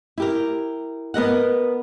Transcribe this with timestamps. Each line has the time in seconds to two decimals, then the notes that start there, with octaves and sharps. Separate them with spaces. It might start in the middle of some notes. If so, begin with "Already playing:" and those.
0.18 E4 G4 A#4
1.14 B3 A#4 D#5 F#5